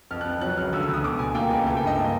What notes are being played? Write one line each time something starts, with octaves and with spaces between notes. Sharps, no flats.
F2 F6
F#6
F2
F#3 F#6
C#2 F6
D2 E6
E6
D2
D#6
B2 D6
B2 G#5
A#3 G5
C#2 G#5
A3 G#5
G5
G2 D#5
A#3